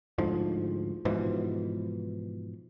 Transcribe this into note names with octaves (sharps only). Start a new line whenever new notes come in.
D2 G#2 F3
G#2 B2 E3 F3